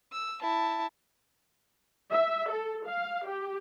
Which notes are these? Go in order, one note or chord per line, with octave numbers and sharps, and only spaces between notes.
E6
E4 A5
E5
A4
F5
G4